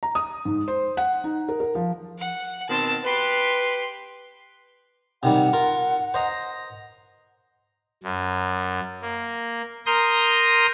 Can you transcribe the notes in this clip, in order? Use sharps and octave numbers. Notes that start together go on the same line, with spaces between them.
A#5
D#6
G#2
C5
F#5
D#4
A#4
A#4
F3
F#5
B2 D#3 C4 A5
G4 B4 C6
C3 D#3 G3 F#5
F4 A#4
C5 D#5 A#5
F#2
A#3
A#4 A#5 C6 D#6 G6